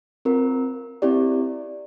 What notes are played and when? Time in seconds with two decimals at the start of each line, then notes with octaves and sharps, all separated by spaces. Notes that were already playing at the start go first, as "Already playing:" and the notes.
0.25 C4 F4 A#4
1.02 C4 E4 G4 D5